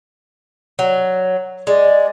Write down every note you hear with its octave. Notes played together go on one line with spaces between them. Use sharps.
F#3
G#3 D5